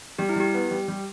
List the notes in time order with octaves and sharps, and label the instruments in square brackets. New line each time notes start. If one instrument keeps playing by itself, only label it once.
[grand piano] G3 [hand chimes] G4
[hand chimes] E4
[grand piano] G3 [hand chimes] G4
[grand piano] B3
G3
G3